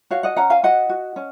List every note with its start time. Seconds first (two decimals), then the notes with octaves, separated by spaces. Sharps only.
0.11 F#4 C#5 F5
0.23 D#5 F#5
0.36 C#4 F#5 A#5
0.50 F5 G#5
0.63 F#4 D#5 F#5
0.89 F#4
1.16 C#4